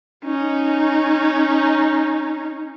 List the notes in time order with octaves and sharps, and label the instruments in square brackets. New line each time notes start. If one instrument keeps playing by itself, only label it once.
[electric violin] C#4 D#4